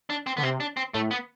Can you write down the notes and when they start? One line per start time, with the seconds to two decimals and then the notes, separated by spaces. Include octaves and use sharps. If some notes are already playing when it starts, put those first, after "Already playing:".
0.10 D4
0.27 C4
0.37 D3 B3
0.43 C3 C4
0.60 D4
0.77 C4
0.94 A2 A3
1.11 B3